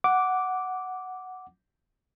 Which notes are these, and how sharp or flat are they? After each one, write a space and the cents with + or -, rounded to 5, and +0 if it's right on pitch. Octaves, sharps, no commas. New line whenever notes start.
F#5 +0 D6 -10